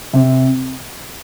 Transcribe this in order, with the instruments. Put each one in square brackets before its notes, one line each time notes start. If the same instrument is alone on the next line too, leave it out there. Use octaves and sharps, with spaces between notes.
[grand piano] C3